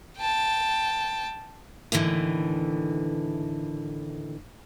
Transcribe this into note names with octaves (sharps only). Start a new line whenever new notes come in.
G5 A5
D#2 A2 D3 E3